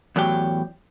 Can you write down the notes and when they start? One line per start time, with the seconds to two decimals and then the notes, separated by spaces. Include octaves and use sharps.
0.16 E2 A2 F#3 G4